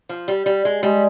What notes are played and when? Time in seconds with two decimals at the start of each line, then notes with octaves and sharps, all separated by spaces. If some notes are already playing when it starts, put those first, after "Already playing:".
0.09 F3
0.28 G3
0.46 G3
0.65 G#3
0.83 G3 G#3